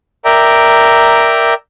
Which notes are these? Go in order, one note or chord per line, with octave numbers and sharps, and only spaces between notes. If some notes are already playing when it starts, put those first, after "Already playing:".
A#4 D5 E5 G5 A#5